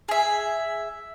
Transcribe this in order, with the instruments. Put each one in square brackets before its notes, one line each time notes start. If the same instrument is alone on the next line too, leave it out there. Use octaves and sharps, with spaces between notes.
[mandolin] G#4 E5